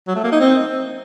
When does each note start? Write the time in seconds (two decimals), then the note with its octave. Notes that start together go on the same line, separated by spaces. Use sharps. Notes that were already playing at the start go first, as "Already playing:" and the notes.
0.07 F#3
0.16 A3
0.24 A#3
0.32 D#4
0.40 C4